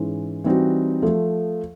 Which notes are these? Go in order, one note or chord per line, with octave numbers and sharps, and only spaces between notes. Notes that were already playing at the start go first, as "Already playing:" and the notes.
Already playing: G#2 E3 G#3 C#4
E3 G3 C4 D#4 F#4
F3 A3